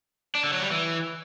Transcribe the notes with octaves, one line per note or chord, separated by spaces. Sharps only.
D4
D3
F#3
G3
E3